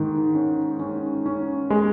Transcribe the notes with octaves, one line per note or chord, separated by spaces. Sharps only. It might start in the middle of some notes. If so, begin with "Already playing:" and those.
Already playing: G#2 D#3
C#4
C#4
C#4
G#3